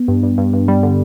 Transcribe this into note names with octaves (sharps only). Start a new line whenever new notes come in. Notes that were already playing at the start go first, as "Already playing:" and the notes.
Already playing: B3
G2
G2
G2
G2
G3
D3